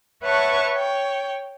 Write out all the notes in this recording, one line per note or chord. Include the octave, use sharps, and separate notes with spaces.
B4 C#5 E5 F#5 A5 C#6
C#5 G5